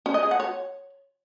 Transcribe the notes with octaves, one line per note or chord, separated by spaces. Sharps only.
C#4
D#5
G#4
F#5
C#5